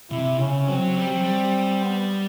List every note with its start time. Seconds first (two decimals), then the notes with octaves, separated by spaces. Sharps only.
0.11 C3 E4
0.39 C#3 C#4
0.68 F#3 C4
0.96 G3
1.09 F#3
1.22 G3
1.83 B3